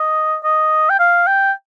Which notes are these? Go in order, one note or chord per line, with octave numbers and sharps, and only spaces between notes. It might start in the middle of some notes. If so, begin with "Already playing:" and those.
Already playing: D#5
D#5
G5
F5
G5